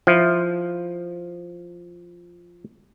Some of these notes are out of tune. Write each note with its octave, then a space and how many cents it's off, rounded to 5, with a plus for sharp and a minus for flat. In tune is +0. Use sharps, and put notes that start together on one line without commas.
F3 +0 E4 +0